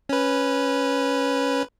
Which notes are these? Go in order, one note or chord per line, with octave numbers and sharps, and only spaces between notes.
C#4 B4